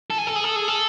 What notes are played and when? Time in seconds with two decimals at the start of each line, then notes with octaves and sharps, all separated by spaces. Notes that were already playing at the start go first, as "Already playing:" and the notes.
0.10 A4
0.18 G#4
0.27 A4
0.36 G#4
0.44 A4
0.56 G#4
0.68 A4